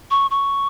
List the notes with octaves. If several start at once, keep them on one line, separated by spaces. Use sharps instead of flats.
C#6
C#6